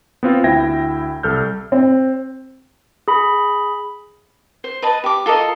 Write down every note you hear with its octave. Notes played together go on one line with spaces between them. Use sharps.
B3 C4 F4
D2 E4 E5 G5 G#6 A#6
C2 A4 F6 G6
C4
G#4 B5
C5
B4 D#5 A5
G4 D6
F4 A4 A#4 D#5